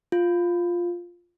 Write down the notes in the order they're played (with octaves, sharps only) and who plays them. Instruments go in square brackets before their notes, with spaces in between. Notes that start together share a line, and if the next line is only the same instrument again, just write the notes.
[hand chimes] F4